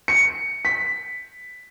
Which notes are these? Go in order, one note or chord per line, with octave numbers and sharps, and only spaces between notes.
C#7
B6